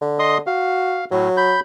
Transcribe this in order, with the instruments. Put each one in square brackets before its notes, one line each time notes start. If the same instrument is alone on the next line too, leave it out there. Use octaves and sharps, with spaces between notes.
[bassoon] D3
[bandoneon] D#5 C6 D#6
[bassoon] F#4 [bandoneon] F5
[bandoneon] A2 [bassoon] F#3
[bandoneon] B5 G6